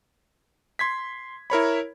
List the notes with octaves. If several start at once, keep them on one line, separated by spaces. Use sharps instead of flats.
C6 G#6 B6
E4 A#4 C#5 B5